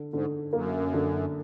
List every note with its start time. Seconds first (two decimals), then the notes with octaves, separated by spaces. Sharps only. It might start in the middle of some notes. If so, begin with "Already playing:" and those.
Already playing: D3
0.13 G#2 D3
0.53 F#2 A#3
0.94 D3